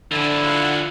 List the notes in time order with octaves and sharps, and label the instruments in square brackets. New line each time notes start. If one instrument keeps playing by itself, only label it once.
[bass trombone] D3 [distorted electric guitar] E3 F3 [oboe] E4
[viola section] F4 F5 F#5